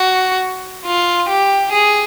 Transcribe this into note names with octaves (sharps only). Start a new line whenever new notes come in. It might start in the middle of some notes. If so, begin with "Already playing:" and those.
Already playing: F#4
F4
G4
G#4